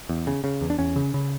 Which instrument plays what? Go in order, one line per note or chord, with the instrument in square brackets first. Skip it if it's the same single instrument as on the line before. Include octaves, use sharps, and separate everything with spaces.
[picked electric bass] E2
C#3
C#3
E2
D4
E2 C#4
C#3
C#3